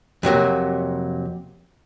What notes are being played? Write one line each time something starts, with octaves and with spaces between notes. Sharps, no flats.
F2 C3 F#3 A#3